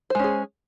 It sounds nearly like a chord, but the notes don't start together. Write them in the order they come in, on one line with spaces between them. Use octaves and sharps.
C5 G#3 C#4 G#4